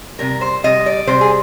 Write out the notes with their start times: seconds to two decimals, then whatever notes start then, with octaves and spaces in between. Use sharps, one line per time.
0.19 C3 G3 A#4
0.41 C5
0.64 C3 G3 D#5
0.86 D5
1.07 C3 G3 C5
1.21 G#4